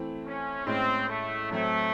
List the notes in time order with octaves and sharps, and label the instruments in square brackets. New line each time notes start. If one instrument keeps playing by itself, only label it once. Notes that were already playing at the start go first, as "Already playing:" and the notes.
Already playing: [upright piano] E3 A3 C4 E4
[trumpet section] C#4
[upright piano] A2 G#3 C#4 [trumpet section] C4
[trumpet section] A3
[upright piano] A2 F#3 C4 [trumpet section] A3